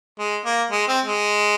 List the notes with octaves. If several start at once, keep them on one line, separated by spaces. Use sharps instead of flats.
G#3
A#3
G#3
C4
G#3